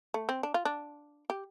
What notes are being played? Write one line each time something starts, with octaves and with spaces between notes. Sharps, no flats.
A3
C4
D4
F4
D4
G4